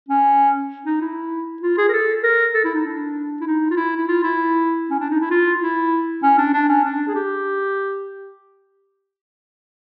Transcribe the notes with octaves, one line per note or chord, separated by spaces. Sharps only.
C#4
D#4
E4
F4
G#4
A#4
A4
A#4
A4
E4
D#4
D4
E4
D#4
F4
E4
E4
F4
E4
C#4
D4
D#4
E4
F4
E4
C#4
D4
D4
C#4
D4
G#4
G4